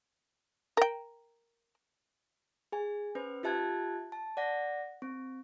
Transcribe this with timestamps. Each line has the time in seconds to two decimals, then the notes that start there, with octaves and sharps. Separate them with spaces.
0.77 A#4 G5
2.72 G#4 G#5
3.15 C#4 B4 C5
3.43 F4 G4 E5 A5 F#6 G#6
4.12 A5
4.37 D5 F#5 A#6
5.02 C4